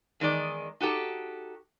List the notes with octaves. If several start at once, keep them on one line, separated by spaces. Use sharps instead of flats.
E2 D#3 G#3 D5
D#4 F#4 G4 A4